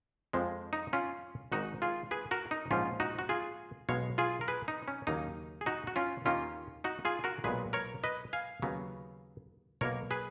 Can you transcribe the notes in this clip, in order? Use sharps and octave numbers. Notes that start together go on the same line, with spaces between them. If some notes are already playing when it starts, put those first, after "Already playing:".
F2 F3 G#3
D#4
C#4 F4
G#1 G#2 D#3 D#4 F#4
F4 G#4
G#4 B4
F#4 A#4
D#4
A#1 G#2 F3 C#4 F4
D#4 F#4
F#4
F4 G#4
B1 B2 G#3 C#5 F5
F4 G#4
A#4
G#4 B4
D#4
C#4
D#2 C#3 F#3 A#3 D#4
G#4
D#4 F#4
F#4
C#4 F4
D#2 D#3 A#3 C#4 F4
D#4 F#4
F4 G#4
F#4 A#4
B1 A#2 G#3 B3 G#4 B4
A#4 C#5
B4 D#5
F5 G#5
D#2 C#3 F#3 B3
B1 B2 A#3 A#4 C#5
G#4 B4